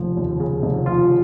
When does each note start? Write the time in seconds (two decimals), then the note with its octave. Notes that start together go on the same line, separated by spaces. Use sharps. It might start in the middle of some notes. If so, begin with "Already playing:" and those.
Already playing: F1 D#2 C#3 F3
0.17 D#2
0.40 C#3
0.63 F1
0.86 F3 F4